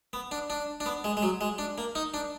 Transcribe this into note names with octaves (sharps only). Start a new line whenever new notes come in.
B3
D4
D4
D4
B3
G#3
G#3
F#3
G#3
D4
A#3
D#4
D4